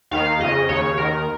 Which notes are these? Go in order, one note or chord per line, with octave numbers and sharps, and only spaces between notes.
D#2 D#3 F5
F2 C#3 D#5
D#2 C#3 C#5
D#2 D#3 A#4